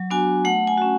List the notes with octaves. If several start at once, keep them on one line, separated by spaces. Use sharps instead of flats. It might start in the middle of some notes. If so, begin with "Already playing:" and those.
Already playing: F#3
B3 D4 F#4 G#5
A3 F#5
G#5
C#4 F#4